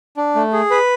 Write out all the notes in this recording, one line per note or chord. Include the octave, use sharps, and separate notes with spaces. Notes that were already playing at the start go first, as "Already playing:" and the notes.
D4
A3
G#4
B4